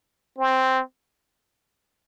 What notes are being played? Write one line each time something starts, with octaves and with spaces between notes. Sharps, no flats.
C4